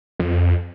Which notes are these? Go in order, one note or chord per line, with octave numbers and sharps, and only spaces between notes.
F2